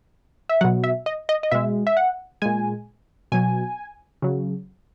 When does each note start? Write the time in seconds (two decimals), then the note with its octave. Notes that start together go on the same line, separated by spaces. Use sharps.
0.49 E5
0.61 B2 F#3 F#5
0.84 E5
1.06 D#5
1.29 D#5
1.43 D#5
1.51 B2 G#3 E5
1.87 E5
1.97 F#5
2.42 A#2 G#3 G#5
3.32 B2 F#3 G#5
4.22 C#3 F#3